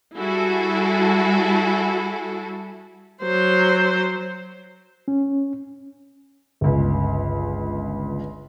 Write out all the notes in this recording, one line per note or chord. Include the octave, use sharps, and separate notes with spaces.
G3 E4 F#4 G#4 A4
F#3 C5
C#4
G1 C#2